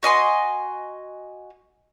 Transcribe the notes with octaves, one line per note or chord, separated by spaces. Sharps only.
F#4 D#5 G#5 C6